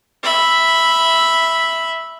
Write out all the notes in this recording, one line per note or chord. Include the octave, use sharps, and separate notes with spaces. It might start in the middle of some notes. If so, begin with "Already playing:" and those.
E5 B5